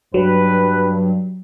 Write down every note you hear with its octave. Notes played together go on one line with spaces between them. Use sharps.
G2 F#3 B4